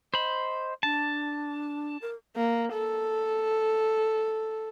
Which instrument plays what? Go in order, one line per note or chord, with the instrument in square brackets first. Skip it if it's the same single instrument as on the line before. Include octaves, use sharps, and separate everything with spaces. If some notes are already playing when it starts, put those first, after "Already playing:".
[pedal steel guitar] C5 B5 [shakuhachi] D#5
[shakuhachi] D4 [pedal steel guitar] A5
[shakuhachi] A#4
[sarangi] A#3
A4